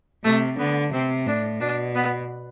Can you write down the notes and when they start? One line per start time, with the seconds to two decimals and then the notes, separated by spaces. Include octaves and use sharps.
0.24 C3 A3
0.58 D3 B3
0.93 C3 C4
1.26 A2 D4
1.60 B2 D4
1.95 B3